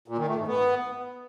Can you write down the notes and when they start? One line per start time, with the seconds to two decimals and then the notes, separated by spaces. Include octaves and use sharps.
0.08 A#2
0.18 D#3
0.28 A3
0.38 G#2
0.48 B3